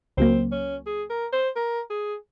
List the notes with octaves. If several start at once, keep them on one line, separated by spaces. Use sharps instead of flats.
C#2 C#3 F#3 A#3 C4
C#4
G#4
A#4
C5
A#4
G#4